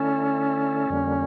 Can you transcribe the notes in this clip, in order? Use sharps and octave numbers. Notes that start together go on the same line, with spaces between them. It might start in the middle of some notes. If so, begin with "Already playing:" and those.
Already playing: D3 A3 C#4 E4 A4
F2 D3 G3 A#3